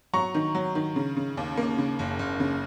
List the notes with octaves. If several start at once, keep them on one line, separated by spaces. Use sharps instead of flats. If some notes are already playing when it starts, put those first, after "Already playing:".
F#3 A#5 C#6
D#3
F#3
D#3
C#3
C#3
D#2
A#3
C#3
F#1
F#1
C#3